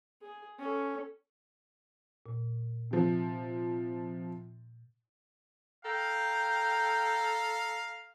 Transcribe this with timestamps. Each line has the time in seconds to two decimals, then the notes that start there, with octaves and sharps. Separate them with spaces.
0.21 G#4
0.59 C#4 A4
2.26 A#2
2.91 C3 F3
5.85 A4 F5 G5 A#5